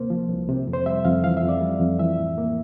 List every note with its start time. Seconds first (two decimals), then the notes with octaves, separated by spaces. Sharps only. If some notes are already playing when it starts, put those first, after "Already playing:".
Already playing: D2 C3 A#3 C5
0.10 F3
0.29 C2
0.49 C3
0.67 F2
0.73 C5
0.86 G3 E5
1.05 F2 F5
1.23 E3 F5
1.37 E5
1.43 F2
1.49 D5
1.61 G3
1.80 F2
1.99 E3 E5
2.19 A2
2.38 A#3